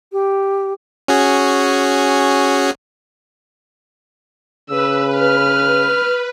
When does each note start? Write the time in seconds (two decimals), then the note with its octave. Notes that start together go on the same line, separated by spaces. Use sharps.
0.12 G4
1.08 C#4 F#4 G#4
4.70 C#3 B4 E6
5.15 F6